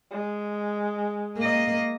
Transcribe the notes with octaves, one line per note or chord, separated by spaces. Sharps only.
G#3
A#3 D#5